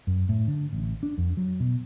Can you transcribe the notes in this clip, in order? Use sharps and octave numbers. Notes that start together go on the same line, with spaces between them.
F#2
A2
D3
A1
D4
F2
F#3
B2